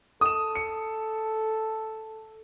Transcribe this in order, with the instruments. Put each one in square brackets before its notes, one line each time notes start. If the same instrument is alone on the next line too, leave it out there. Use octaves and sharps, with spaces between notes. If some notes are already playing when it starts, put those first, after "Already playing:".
[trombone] A4 [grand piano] D#6 E7
[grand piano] C#7